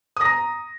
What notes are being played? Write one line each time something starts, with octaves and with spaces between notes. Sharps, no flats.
A#5 D#6 A#6